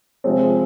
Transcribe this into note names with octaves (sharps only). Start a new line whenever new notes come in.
C3 F3 G#3 C4